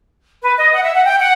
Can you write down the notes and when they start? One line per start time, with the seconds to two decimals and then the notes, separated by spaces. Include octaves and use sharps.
0.42 B4
0.58 D#5
0.73 F#5
0.84 E5
0.95 F#5
1.04 G5
1.20 F#5